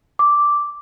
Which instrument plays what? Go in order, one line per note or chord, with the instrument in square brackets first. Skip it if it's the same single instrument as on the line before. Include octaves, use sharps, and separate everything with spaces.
[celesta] D6